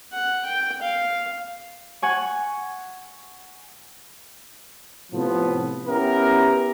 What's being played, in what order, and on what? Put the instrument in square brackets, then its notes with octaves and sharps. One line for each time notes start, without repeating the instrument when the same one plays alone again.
[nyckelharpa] F#5
G5
F5
[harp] F#5 G#5 C#6
[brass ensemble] A2 C3 F3 B3
B3 C#4 E4 G4 A#4